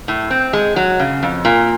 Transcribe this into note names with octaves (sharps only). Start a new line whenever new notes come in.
A2
C4
G#3
F#3
C#3
F2
A#2